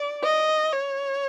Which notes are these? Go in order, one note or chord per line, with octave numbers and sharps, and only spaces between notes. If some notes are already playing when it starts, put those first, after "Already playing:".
Already playing: D5
D#5
C#5